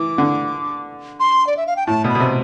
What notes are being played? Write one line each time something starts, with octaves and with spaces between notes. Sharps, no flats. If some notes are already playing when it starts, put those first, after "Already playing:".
Already playing: E3 D6
D3
C6
D5
E5
F5
G5
A2 A5
B2
B5
B2
C3